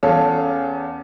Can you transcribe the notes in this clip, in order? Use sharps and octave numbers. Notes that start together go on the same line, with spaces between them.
E2 C#4 A4 F5